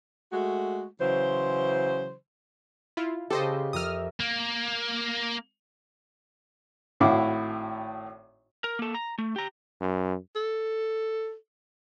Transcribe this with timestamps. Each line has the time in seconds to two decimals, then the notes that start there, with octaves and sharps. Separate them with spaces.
0.33 G#3 A3 F#4
1.00 C#3 E3 F#3 C5
2.97 E4 F4
3.30 C#3 G4 A4 C5 D#5
3.73 F2 A#4 E5 D#6 F6
4.20 A#3
7.00 G#1 A2 E4 F#4 F5 D6
8.64 A#4
8.79 A#3 A4
8.94 A#5
9.18 A3
9.36 G4 A#5
9.81 F#2
10.36 A4